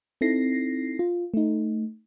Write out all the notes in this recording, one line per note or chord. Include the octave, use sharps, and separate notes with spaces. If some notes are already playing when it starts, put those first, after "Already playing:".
C4 D#4 E4 A4 A#6 C7
F4
A3 D#4